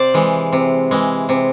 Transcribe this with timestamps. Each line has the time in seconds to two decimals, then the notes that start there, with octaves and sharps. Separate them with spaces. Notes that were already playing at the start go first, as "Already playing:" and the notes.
Already playing: C3 C5 D5
0.14 E3 G#3
0.53 C3
0.91 E3 G#3
1.29 C3